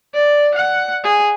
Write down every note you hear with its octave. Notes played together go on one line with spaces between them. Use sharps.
D5
F#5
G#4